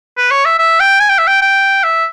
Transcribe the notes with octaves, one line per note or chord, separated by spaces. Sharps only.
B4
C#5
E5
E5
G5
G#5
G5
E5
G5
G5
E5